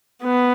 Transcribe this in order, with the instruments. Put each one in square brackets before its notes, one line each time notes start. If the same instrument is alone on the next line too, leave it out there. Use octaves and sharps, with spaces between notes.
[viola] B3